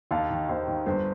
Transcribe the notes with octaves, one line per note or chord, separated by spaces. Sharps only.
D#2 F5 A5
D#3
D#2 C5
D#3
G1 C5